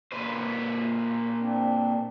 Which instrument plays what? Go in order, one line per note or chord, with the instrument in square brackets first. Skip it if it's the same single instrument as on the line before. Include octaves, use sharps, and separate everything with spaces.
[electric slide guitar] A#2 B4 C5
[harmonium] C4 D4